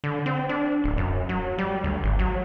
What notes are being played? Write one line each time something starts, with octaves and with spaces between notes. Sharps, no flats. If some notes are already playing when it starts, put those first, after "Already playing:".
D3
C4
D4
D1
F#2
F#3
G3
D2
G#1
F#3